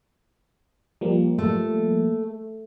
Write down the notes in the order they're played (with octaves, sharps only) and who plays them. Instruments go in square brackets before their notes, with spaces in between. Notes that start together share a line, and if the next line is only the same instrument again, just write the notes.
[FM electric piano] F3 G3 A#3
[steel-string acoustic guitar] A3